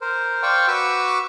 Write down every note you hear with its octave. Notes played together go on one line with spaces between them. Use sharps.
A#4 C5
C5 D5 F5 G5 C#6
F#4 B4 C#6 D6 E6